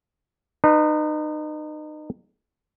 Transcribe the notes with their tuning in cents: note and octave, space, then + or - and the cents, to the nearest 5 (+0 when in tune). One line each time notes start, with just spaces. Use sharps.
D#4 -30 B4 +0